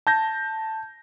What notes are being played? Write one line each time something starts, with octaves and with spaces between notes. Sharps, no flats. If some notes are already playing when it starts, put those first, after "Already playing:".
A5 G6 A#6